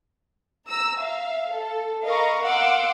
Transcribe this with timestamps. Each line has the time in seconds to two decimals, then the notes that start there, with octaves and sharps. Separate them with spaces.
0.67 A#5 E6
0.99 E5 F5
1.51 A4
2.05 A#4 D#5 F5 A#5 B5 C#6
2.44 F5 F#5 C6 D6 E6